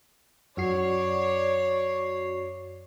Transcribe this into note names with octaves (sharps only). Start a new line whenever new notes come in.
F#2 F#4 C#5 D5 C7